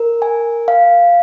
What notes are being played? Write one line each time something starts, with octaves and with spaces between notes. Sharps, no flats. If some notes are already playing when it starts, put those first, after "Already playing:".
Already playing: A#4
G#5
F5